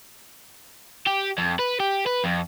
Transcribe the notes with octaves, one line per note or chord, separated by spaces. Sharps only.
G4
F2
B4
G4
B4
F2